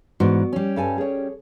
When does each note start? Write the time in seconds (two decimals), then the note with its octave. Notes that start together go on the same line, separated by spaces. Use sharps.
0.20 G#2 E3 B3 F#4 D5
0.53 G3 C#4
0.76 G2 A4 G#5
0.98 G#4 C#5